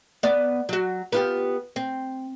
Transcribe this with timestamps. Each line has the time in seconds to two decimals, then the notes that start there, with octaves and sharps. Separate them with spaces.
0.23 B3 D5
0.69 F#3 F#4
1.12 B3 F4 G4
1.76 C4